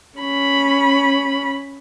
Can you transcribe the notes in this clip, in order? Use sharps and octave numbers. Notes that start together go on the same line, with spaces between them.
C#4 B5